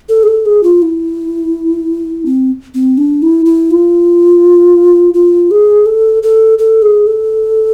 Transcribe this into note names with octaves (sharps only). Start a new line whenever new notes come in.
A4
G#4
A4
G#4
F4
E4
C4
C4
D4
E4
E4
F4
F4
G#4
A4
A4
A4
G#4
A4